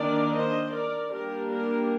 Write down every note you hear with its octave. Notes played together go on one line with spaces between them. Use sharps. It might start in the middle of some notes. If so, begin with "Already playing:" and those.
Already playing: D#3 A#3 D4 A#4 D5
C5 D#5
A#4 D5
G3 A#3 D4 G4 A#4
G4 A#4